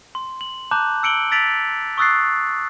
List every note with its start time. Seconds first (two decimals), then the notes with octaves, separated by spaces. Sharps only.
0.15 C6
0.41 F#7
0.71 A5 A#5 D6 F#6 G6
1.03 E6 C#7 D7 F#7 G7
1.31 E6 A6 B6 D7 F7 F#7
1.98 C#6 D#6 E6 F#6 A6 C7